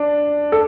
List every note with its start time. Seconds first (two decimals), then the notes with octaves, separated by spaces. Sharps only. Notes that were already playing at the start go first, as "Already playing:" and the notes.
Already playing: D4
0.52 A4